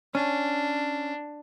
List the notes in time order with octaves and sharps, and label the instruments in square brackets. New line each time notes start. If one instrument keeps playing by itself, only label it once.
[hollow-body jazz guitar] C#4 [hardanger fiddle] D4